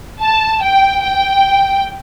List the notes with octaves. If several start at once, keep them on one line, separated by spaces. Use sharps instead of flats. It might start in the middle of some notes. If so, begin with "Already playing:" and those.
A5
G5
G5